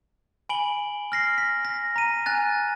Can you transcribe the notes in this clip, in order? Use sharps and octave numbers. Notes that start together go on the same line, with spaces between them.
G#5 B5 D7 F#7 G7
F6 A#6 C7
B6
A#6
A#5 D#7
G#5 F#6 A6